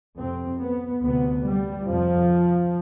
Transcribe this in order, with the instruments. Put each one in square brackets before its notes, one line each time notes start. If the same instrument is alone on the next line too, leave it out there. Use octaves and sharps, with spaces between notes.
[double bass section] F2 C3 C4
B3
D2 C3 B3
G3
F2 C3 F3